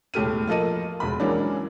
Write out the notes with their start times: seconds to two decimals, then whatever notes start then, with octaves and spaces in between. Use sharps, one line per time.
0.14 E1 A2 G4 A4 F6 D#7
0.47 F3 A#3 A4 D#5 D#7
1.00 E1 B5
1.20 E3 F#3 G#3 A#3 C#4 D4